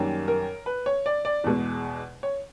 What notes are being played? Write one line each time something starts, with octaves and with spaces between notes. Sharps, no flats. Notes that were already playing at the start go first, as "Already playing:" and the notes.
Already playing: F#2 D#3 G3 A#3
A#4
B4
C#5
D5
D5
E2 B2 G#3
C#5